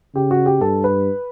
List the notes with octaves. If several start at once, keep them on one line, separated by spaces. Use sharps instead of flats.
C#3 G4
F#4
G4
G2 A4
B4